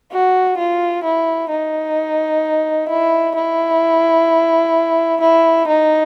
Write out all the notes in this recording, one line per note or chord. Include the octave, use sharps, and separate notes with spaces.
F#4
F4
E4
D#4
E4
E4
E4
D#4